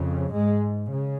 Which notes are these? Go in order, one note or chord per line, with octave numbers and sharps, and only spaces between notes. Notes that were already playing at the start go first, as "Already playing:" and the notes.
Already playing: F2 C#3
G#2 G#3
C#3